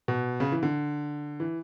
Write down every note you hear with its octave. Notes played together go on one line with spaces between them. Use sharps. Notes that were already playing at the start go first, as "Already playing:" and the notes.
B2
C#3
E3
D3
E3